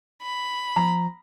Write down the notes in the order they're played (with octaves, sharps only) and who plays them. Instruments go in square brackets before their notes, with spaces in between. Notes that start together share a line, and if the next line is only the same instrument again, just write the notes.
[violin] B5
[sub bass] F3 [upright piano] A#5